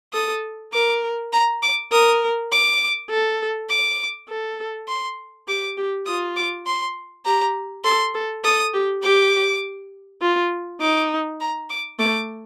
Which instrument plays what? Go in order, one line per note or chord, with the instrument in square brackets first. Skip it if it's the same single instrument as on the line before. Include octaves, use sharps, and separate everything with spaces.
[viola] A4 [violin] D#6
[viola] A#4 [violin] D6
[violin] A#5
D6
[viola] A#4 [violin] D#6
[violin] D6
[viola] A4
[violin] D6
[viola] A4
[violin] C6
[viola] G4 [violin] D6
[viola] G4
[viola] F4 [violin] D#6
[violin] D6
C6
[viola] G4 [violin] A#5
[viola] A4 [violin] C6
[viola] A4
[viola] A4 [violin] D#6
[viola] G4
[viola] G4 [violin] D6
[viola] F4
[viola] D#4 [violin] D6
[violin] A#5
D6
[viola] A3 [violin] D6